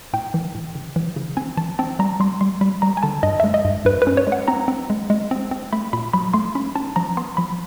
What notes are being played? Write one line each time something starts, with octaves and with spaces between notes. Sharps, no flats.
A2 G5
E3
A2
C#3
E3
C#3
C4 G#5
E3 A5
C4 A5
G3 A#5
G3 C6
G3 C6
G3 B5
G3 A#5
G#5
D3 A5
G2 D#5
E5
G#3
D#5
G2
G2 B4
B4
C#4
C#5
G#3
F#5
C4 A#5
C4
G#3
G#3
C4
C4
A3 B5
A#2 B5
F#3 B5
A3 C6
C#4 B5
C#4 A5
F3 A#5
B3 C6
F3 B5